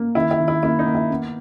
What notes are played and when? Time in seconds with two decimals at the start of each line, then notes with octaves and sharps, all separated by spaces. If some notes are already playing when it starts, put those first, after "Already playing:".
Already playing: A#3
0.15 D#3 E4
0.31 E4
0.40 D#3
0.48 E4
0.63 A#3 E4
0.79 D#4
0.86 A#3
0.95 E4
1.10 B3